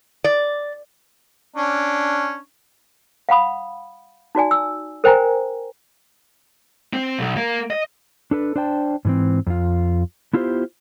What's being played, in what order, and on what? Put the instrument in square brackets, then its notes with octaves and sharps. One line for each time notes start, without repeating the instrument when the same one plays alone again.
[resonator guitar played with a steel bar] D5
[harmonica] C#4 D4
[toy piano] F5 F#5 B5 D#6
D#4 F#4 D5 G#5
E6
A#4 C5 G5 G#5 A#5
[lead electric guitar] C4
B1
A#3
D#5
[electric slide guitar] D4 A4 B4
D4 C5 D5 G5 A5
G#2 E3 C4
F2 F4
B3 E4 F4 G4 B4 C5